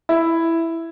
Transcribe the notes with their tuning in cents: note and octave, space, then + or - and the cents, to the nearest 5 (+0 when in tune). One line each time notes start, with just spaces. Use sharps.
E4 +5